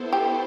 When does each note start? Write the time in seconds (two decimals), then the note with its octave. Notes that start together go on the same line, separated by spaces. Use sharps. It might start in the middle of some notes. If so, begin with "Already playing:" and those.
Already playing: B3 E4 A4 C5
0.13 G4